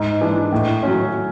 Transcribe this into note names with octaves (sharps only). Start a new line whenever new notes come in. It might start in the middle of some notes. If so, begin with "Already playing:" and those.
Already playing: G#2
E3 G#3 D4
A2
F#3 C#4